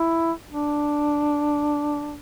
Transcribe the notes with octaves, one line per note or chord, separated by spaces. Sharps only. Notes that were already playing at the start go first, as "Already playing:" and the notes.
Already playing: E4
D4